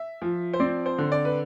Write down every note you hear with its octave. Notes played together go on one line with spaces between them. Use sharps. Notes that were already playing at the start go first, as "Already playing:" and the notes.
Already playing: E5
F3
C5
C4 D5
C5
D3
D5
B4